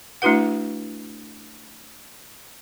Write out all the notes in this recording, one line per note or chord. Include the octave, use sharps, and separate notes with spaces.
A3 D4 E4 F#4 B4 F#5